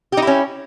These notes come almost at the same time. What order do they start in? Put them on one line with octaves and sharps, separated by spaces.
G4 D#4 E4 C#4